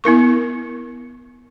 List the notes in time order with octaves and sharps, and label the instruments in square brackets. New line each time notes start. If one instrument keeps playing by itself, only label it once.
[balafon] B3 E4 A#4 C#6